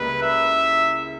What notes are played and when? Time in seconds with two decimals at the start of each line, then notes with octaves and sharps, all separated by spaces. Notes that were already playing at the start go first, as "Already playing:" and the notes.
Already playing: C#2 G3 A#3 E4 B4
0.22 E5